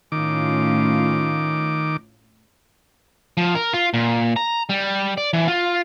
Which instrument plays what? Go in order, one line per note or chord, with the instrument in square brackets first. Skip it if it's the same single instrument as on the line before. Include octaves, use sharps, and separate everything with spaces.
[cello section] A2 C#4 F4 [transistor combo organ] D#3 D6
[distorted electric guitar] F3
A#4
F4
A#2
A#5
G3
D5
E3
F4